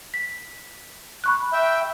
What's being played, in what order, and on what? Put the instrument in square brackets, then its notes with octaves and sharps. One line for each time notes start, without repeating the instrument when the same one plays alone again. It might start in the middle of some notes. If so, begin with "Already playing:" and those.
[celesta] B6
B5 C#6 F#6
[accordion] E5 G5